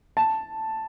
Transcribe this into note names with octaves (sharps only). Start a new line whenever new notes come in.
A5